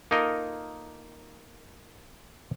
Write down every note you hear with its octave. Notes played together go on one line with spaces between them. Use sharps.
A#3 D#4 F4 A4 A#4 D#5